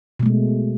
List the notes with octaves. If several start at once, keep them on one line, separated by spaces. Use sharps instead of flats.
B2 G#3 A3